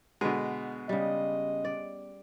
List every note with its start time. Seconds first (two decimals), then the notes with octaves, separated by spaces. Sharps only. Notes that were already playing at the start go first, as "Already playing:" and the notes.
0.21 B2 D3 G#3 B3
0.89 C#3 G3 D#5
1.65 D5